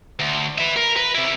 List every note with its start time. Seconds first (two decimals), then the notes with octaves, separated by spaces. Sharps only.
0.19 D2
0.58 B4 E5
0.76 A#4
0.97 B4
1.15 C3 E4